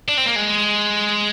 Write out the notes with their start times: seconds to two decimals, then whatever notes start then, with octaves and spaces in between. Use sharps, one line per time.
0.09 D4
0.18 C4
0.26 A#3
0.36 G#3